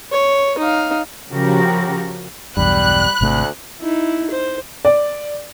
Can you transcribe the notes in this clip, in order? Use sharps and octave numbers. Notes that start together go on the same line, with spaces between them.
C#5
D#4 F5
C#3 F3 F#4 G4 A#4
B1 E2 G2 G3 B5 F#6
G#1 D2 C3 A3
D#4 E4
C5
D5